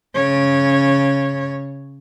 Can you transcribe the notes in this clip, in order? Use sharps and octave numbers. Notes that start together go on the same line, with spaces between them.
C#3 C#5